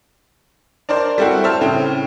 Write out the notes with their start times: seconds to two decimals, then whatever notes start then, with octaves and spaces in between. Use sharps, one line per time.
0.89 D4 A#4 C5 D5
1.18 G3 A3 C4 E4 F#4
1.44 C5 E5 A5 F6
1.61 A2 C#3 C4